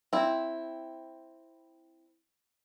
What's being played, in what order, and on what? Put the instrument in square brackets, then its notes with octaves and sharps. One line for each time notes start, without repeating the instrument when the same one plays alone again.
[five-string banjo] C4 E4